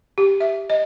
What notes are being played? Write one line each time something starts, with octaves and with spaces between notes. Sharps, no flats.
G4
E5
D#5